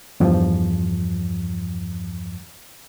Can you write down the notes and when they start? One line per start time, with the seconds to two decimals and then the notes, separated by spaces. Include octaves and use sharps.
0.20 E2 G2 F3